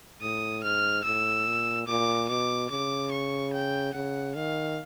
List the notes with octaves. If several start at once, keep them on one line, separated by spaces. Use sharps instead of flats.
A2 D#6
G#2 F6
A2 E6
A#2
A#2 D6
B2 D6
C#3 D6
C#6
G5
C#3 F#5
D#3 F5